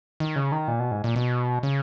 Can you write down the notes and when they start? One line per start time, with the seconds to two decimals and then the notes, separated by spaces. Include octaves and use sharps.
0.20 D#3
0.36 C#3
0.52 D#3
0.68 A#2
0.79 B2
0.91 G#2
1.04 A#2
1.16 B2
1.63 C#3